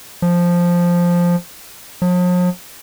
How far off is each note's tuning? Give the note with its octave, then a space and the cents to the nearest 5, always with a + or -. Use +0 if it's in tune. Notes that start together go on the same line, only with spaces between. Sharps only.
F3 +0
F3 +45